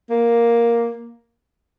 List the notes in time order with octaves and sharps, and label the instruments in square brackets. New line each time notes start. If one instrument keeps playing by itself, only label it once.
[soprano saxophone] A#3